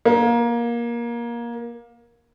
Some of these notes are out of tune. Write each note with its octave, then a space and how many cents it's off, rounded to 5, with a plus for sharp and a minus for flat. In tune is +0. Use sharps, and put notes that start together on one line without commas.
A#3 +20